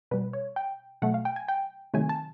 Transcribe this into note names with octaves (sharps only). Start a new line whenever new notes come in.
B2 G3 B4
C#5
G5
B2 F#3 A3 F#5
F5
G5
G#5
G5
C3 D#3 F#3 A3 G#5
A5